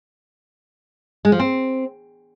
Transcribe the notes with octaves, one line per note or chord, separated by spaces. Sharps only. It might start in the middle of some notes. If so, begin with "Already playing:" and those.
G#3
F3
C4